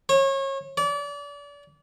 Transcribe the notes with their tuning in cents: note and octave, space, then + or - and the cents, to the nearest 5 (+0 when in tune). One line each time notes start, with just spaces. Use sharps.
C#5 -30
D5 -35